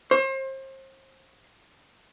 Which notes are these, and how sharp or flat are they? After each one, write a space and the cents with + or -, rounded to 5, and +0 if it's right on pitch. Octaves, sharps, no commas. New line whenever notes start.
C5 +35